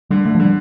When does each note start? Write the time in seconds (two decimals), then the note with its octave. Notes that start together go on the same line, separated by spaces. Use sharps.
0.10 D3 G3
0.25 D3 A3
0.35 F3
0.40 D3 G3